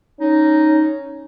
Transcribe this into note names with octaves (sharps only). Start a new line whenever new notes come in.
C#4 D#4